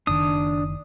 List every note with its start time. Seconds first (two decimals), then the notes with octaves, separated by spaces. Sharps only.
0.07 F#1 D#3 D4 D#6